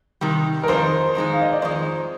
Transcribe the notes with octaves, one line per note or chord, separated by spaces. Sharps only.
C3 D#3 G3
A#4
F2 D#3 G#3 D#4 C5
F2 D#3 G#3 D#4
F5
D#5
D5
F2 D#3 G#3 D#4 C5